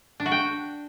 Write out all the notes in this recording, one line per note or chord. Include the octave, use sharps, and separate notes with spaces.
D4
F#4
G5